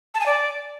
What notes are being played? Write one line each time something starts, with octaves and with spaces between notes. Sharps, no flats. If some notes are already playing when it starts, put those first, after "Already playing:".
A5
G#5
D5